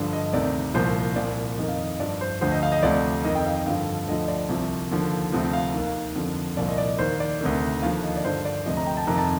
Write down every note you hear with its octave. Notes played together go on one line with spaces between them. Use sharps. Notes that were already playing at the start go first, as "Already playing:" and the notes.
Already playing: G2 D3 F3 D5
D#5
D2 C3 D#3 D5
C2 A#2 F3 C5
C2 A#2 F3 D5
F2 D#3 D#5
F5
D#5
G2 F3 D5
C5
D2 D3 F3 C5
D#5
F5
D#5
D2 C3 F3 D5
F2 D#3 D#5
G5
F5
G2 D3 F3 F5
D2 D3 F3 D#5
D5
C2 C3 F3
D#2 D3 F3
D2 C3 F3
F5
D#2 D#3
F2 D3 F3
C2 A#2 F3 D5
D#5
D5
D#2 D#3 C5
D5
D2 C3 D#3
D#2 D3 F3 F5
D#5
D5
G2 D3 F3 C5
D5
D2 C3 F3 D#5
A#5
G5
A5
F2 C3 D#3 A#5
A5